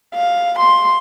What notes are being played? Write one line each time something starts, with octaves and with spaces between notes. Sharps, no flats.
F5
C6